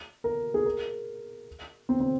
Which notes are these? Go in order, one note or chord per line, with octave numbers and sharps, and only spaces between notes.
A#4
G#4
A#4
C4
C4